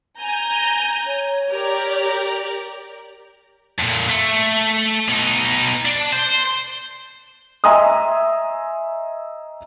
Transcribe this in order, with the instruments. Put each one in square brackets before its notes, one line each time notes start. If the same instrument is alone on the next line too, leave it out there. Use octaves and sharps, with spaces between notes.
[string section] G#5 A#5 G6
[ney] C#5
[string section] G4 A#4 D5
[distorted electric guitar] F2 A#2
A3
B2 D#4
D4
C5
[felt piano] D#5 E5 G#5 A#5 C6 D#6